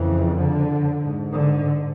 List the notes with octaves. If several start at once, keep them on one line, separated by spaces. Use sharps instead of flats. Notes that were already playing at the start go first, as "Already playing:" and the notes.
Already playing: F2 C#3 E3
D3
G#2
D3